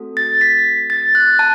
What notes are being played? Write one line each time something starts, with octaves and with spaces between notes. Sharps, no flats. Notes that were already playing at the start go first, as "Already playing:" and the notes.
Already playing: A3 C4 F#4 A4
A6
B6
A6
F#6
A5